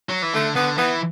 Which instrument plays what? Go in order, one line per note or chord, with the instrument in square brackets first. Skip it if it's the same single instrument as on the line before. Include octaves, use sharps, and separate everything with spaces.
[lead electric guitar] F#3
E3
[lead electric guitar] D3 [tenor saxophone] A3
[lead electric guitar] D3 [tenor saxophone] B3
[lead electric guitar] E3 [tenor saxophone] B3